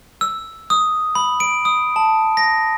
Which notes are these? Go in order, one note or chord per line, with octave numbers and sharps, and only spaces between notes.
E6
D#6
B5
D7
D#6
A5
A#6